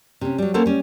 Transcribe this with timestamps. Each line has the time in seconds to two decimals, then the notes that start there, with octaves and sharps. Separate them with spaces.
0.21 C3 C#4
0.38 F#3 G3
0.54 A#3 C#4 A4 C5 F#5
0.66 G3 C#4